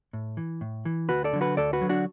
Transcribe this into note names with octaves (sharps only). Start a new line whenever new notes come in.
A2
E3
A2
E3
D2 F#4 B4
A4 D5
D3 F#3
F#4 B4
D2 A4 D5
F#4 B4
D3 F#3
D4 F#4